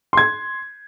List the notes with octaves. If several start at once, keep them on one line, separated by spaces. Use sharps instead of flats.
C6 G#6